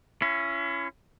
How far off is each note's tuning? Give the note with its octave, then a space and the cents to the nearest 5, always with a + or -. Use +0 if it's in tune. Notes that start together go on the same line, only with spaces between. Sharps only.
C#4 +0 E4 +40